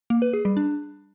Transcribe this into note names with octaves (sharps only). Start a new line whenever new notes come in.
A#3
B4
G#4
G3
D4